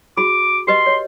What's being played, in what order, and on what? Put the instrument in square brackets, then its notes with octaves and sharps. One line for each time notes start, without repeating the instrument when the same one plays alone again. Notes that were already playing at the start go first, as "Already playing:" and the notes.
[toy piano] F#4 G#4 B5 [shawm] D6
[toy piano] G4 B4 D#5 [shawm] C6
[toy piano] C#5